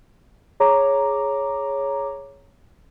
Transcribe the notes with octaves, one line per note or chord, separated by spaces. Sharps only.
G#4 C#5 A#5 D6